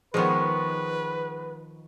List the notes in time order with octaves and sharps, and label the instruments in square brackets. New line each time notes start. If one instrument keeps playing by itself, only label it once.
[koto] D#3 F3 [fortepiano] G#3 B3 [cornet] B4 [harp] C#6 F6 G#6